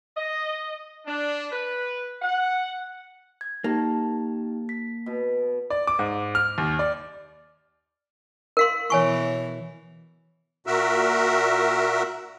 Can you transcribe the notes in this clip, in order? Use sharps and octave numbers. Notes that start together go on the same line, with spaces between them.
D#5
D4
B4
F#5
G#6
A#3 D#4 G4 A5
B6
B2
D5
D6
G#2
F6
D#2
D5
A#4 F5 C6
B2 E3 C#5 G#5 C#6
A#2 F#4 A#4 E5